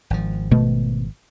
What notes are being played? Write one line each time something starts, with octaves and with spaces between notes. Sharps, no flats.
G#1 F3
B2 A3